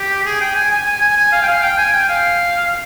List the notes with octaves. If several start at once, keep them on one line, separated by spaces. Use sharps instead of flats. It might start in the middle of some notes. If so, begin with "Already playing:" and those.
Already playing: G4
G#4
G5
G#5
G#5
G#5
G#5
G#5
F5
G5
F5
G5
G#5
G5
F5